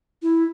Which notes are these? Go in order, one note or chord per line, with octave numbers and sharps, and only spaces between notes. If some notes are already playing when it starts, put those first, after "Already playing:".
E4